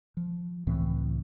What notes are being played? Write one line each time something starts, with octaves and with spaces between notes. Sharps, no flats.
F3
C#2 A2 E3 C4